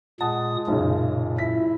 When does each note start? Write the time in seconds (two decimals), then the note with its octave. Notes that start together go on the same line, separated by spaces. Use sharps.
0.21 A#2 G#3 F#5 A5 D#6
0.67 B1 F#2 A#2 C#3
1.38 E4 B6